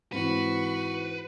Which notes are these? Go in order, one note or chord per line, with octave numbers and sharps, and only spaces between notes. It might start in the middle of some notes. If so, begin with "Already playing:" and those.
G#2 E3 C4 F#4 B4